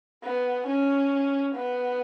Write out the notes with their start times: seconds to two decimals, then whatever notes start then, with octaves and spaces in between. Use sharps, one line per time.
0.23 B3
0.67 C#4
1.55 B3